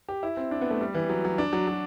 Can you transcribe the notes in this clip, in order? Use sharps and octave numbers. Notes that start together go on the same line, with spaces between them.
G4
E4
C4
D4
B3
A3
G3
E3
F#3
F#3
D4
F#3
F#3